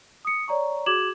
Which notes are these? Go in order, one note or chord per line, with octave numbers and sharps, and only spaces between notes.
D#6 C#7
C#5 D5 A#5 C#6
F#4 G#4 D6 G#6 E7 F#7